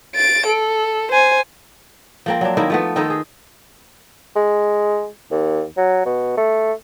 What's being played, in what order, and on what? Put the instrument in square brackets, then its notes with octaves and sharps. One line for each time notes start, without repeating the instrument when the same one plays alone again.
[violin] A6 D7
A4
C5 G#5
[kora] F3 A#3 C4
F#3 D4
D#3 A#3 E4
F3 A3 B3
D#3 D#4 A4 C5
G#4
[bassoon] G#3
D#2
F#3
B2
A3